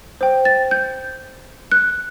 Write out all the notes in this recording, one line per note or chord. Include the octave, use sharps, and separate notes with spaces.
C5 G5
A6
G6
F#6